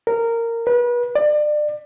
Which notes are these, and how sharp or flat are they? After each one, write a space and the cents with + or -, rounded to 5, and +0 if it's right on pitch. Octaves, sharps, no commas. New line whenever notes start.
A#4 -15
B4 -35
D5 +30